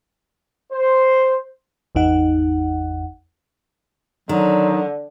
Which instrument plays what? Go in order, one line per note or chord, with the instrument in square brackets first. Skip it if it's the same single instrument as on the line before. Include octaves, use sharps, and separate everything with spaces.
[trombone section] C5
[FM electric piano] G#1 E2 D#4 F#5
[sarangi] D3 [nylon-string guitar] D#3 [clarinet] F#3